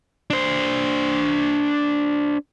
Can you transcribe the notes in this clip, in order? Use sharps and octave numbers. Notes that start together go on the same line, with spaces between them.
D4 C5